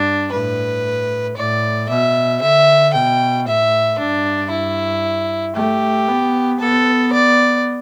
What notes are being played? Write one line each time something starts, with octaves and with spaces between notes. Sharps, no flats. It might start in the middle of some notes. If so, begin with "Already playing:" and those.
Already playing: G2 D4
A2 B4
A2 D5
B2 E5
D3 E5
B2 G5
A2 E5
G2 D4
E4
A3 G4
B3
B3 A4
D5